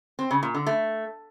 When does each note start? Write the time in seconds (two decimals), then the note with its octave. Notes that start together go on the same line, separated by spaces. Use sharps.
0.19 C4
0.31 C#3
0.43 A#2
0.55 D3
0.66 A3